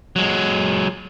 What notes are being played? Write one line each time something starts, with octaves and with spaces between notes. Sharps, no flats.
F#3 G#3